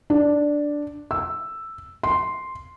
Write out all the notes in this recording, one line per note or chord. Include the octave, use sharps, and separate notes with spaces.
D4
E6
C6